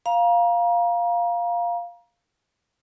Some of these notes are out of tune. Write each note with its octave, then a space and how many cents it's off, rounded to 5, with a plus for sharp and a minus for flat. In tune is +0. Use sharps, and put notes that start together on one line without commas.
F5 +0 A#5 +30